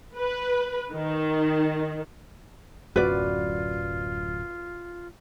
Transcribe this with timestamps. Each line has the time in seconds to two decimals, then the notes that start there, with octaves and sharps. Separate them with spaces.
0.15 B4
0.92 D#3
2.96 D1 F#2 F4 F#4 B4 D5